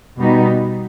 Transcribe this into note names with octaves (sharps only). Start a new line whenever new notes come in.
B2 G3 B3 D#4